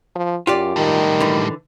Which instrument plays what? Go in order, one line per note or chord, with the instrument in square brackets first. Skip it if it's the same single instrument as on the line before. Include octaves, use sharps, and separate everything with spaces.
[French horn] F3
[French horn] F#2 [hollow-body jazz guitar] F4 G4 D5
[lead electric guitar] A2 G3 [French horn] D#3
[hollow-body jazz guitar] D3 E3